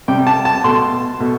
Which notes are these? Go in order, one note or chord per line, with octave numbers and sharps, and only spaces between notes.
C3 G3 G5
A5
A5
B2 A3 C6
B2 A3